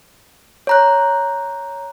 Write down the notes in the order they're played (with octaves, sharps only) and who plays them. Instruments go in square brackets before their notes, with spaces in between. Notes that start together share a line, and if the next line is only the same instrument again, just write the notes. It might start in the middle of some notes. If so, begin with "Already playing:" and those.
[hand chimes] C#5 A#5 F#6